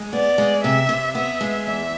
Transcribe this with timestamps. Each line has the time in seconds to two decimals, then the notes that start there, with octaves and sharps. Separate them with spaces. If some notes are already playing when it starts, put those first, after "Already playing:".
Already playing: G#3
0.13 B3 D5
0.38 G#3
0.63 C3 E5
0.89 C3
1.15 B3 E5
1.41 G#3
1.66 E2 E5